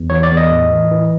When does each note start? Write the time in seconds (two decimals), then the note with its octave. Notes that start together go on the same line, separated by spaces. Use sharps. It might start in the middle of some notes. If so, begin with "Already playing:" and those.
Already playing: E2
0.10 E3 C#5
0.23 D5
0.31 E2
0.37 D#5
0.51 A2
0.72 E3
0.91 E3